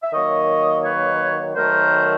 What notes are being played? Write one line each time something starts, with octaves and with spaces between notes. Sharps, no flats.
E5
D#3 F#3 A#3 C#5 D#5
B4 C#5
D#3 F#3 A3 A#4 C5